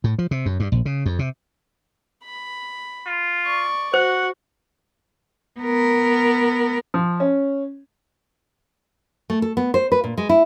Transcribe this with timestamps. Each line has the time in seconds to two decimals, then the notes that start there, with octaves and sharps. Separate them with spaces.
0.04 A2
0.19 F3
0.31 C3
0.46 F#2
0.60 G2
0.72 A#1
0.86 C#3
1.06 F2
1.19 C3
2.24 B5
3.07 F4
3.46 D5 C#6
3.94 F#4 C5 F#5
5.60 B3 A#4
6.94 F3
7.20 C#4
9.30 A3
9.42 A4
9.57 B3
9.74 C5
9.92 B4
10.04 A#2
10.18 G#3
10.29 E4